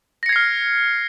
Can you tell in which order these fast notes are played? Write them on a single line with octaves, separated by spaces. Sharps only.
A#6 C#7 G#6 C7 F6